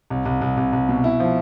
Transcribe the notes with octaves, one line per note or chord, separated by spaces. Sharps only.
C2
C2
C2
C2
C2
B2
E4
F3